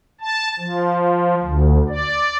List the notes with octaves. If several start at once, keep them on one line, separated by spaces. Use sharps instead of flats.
A5
F3
D2
D5